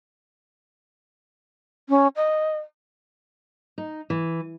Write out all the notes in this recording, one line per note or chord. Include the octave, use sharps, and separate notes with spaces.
C#4
D#5
D#4
E3